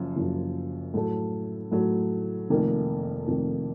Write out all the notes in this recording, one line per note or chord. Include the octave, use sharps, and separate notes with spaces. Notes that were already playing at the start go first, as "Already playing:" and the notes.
Already playing: F#1 F#2 F3
F#1 F#2 F3
A2 F#3 A3
A2 F#3 A3
F1 F2 D#3 A#3
F1 F2 D#3 A#3